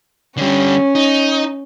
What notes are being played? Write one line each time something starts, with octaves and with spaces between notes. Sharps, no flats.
D3 G3 C#4
D#4